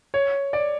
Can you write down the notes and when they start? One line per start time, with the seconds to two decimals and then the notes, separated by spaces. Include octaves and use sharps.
0.14 C#5
0.53 D5